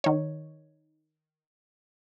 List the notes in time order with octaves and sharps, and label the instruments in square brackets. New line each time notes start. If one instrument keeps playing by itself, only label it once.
[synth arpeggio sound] D#3 C#5